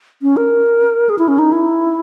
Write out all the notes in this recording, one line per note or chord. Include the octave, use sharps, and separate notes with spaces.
C#4
A#4
G#4
E4
C#4
D#4
E4